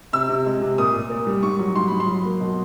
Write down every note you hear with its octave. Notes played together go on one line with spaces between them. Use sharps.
C3 E6
C3
G#3
C3
A#2 D#6
A#2
A#2
G3
G#2 C#6
F#3
G#2 C6
G#2 B5
C6
F#3
A#3
B2